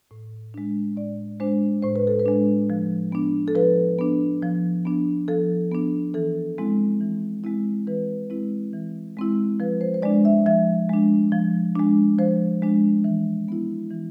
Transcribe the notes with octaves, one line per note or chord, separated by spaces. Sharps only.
A2
G#3 D4
A2 D5
G#3 D4 C5
A2 C5
B4
A4
B4
G#3 D4
F3
B3 D4
A4
F3 B4
B3 D4
F3
B3 D4
F3 A4
B3 D4
E3 A4
G#3 C4 E4
E3
G#3 C4 E4
E3 B4
G#3 C4 E4
E3
G#3 C4 E4
F3 B4
C5
C5
G#3 D4 D5
E5
F3 E5
G#3 D4
F3
G#3 D4
F3 C5
G#3 D4
E3
B3 E4
E3